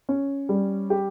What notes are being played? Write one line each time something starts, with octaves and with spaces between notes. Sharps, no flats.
C#4
G3
G4